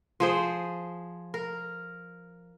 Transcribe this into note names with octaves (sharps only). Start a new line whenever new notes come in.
F3 G#4 C5
A#4